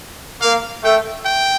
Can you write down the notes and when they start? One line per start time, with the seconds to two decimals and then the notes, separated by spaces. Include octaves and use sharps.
0.42 A#3 F5
0.84 A3 G5
1.25 G5